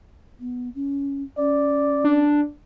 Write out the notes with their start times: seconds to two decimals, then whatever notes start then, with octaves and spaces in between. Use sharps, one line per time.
0.40 B3
0.75 C#4
1.38 C#4 D5
2.04 D4